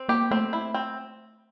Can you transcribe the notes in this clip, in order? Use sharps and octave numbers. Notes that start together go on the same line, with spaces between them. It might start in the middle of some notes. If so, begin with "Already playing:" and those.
Already playing: C4
A#3 G4
A3 C4
E4
C4